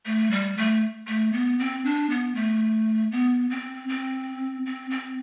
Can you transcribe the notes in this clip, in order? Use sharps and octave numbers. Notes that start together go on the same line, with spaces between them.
A3
G3
A3
A3
B3
C4
D4
B3
A3
B3
C4
C4
C4
C4